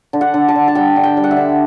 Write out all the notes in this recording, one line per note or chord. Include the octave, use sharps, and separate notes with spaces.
D3
F#5
D3
A5
D3
A5
G3 G5
D3
G5
G3
F#5
E5
D3